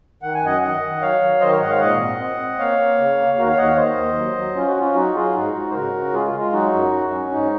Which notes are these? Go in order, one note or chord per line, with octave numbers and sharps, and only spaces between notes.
D#3 F#5
G#5
F#2 D#5 F#5
D#3 D#5 F#5
D#3
F#3 C#5 F5
F#3
D#3 C5 D#5
A#4 C#5
G#2 D#5 F#5
C#5 F5
A#2 D#5 F#5
C4
C4
C4
A#3 C#5 F5
A#3
C#3
A#3
D#2 F#4 A#4
C#5 F5
D#2 D#5 F#5
C#5 F5
D#3 C5 D#5
D#2
F#3
F#3
C#4 F4
F#4
C#4 F4
F#3 D#4 F#4
F#3 F4 G#4
G#2 D#4 F#4
G#2
C5
C#3 F#4 A#4
C#3
G#3 F4 G#4
F4
G#3
F4
F#3 D#4 F#4
F#2
F#3
C#4
G#2 D#4